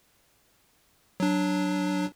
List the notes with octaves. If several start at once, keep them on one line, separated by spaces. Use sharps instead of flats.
F#3 D4